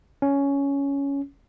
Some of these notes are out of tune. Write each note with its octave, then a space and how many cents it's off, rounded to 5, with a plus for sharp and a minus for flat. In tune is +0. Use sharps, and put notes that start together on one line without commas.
C#4 +10